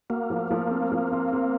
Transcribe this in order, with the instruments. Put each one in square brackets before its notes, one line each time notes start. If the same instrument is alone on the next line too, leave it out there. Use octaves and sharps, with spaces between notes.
[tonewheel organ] A#3 [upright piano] F#4
[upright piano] F3
F3
C4
F3
C4
C4